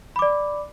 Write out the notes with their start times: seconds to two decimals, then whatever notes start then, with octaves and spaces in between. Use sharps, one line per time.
0.16 B5
0.19 D6
0.22 D5